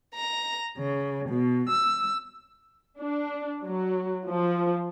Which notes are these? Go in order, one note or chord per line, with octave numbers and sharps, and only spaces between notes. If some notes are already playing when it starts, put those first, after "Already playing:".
A#5
C#3
B2
E6
D4
F#3
F3